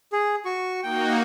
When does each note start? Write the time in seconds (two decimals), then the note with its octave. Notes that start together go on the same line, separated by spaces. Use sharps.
0.13 G#4
0.45 F#4 C#6
0.83 A#3 D#4 F#4 G5